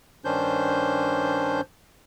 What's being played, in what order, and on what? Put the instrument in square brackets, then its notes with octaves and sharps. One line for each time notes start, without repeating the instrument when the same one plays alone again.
[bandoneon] G2 D#3 C#4 D4 C5 G6